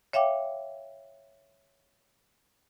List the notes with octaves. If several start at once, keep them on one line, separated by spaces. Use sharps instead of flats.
C#5 E5 F5 G5 D6